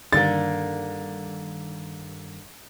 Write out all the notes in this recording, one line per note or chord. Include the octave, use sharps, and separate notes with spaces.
G2 D3 D#3 G3 A#3 A6